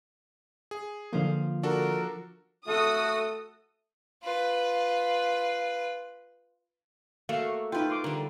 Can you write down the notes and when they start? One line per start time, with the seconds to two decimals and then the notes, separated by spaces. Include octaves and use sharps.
0.71 G#4
1.13 D3 F3 A#3 C5 F5
1.63 D4 F#4 A4 A#4
2.68 A3 F#4 A4 D#6
4.23 F4 B4
7.29 A3 A#3 F#4 F5
7.72 D#4 F4 B4 G5
7.90 C6 D6
8.04 D3 G3 A#4